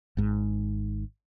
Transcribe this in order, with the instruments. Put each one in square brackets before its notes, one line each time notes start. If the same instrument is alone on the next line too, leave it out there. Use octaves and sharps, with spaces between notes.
[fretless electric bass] G#1 G#2